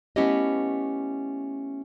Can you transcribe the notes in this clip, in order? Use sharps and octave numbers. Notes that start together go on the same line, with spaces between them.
A3 B3 C#4 E4 G4 D#5